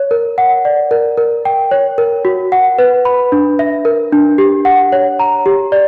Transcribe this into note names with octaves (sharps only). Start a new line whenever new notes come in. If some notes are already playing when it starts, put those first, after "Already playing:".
Already playing: C#5
A#4
F#5
D5
A#4
A#4
G5
C#5
A#4
F#4
F#5
B4
B5
D4
E5
A#4
D4
G4
F#5
C#5
A#5
G4
D5